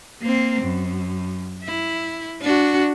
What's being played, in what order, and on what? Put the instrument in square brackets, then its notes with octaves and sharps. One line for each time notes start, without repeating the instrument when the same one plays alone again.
[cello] A#3 C4
F#2
E4
D4 F#4